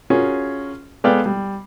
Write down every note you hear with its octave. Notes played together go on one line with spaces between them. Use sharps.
C#4 F4 F#4 G#4 A#4
G#3 B3 A4 D5 F5 G5
G3